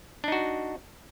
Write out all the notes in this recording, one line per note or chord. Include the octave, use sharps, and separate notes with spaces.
D4 D#4 F#4